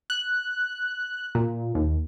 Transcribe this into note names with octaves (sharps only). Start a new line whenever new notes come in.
F#6
A#2
D#2